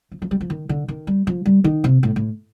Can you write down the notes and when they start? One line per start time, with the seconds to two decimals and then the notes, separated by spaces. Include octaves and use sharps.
0.12 F3
0.22 F3
0.31 G3
0.41 F3
0.50 D#3
0.69 D3
0.88 D#3
1.07 G3
1.27 F3
1.46 G3
1.64 D#3
1.84 C3
2.03 A2
2.16 A2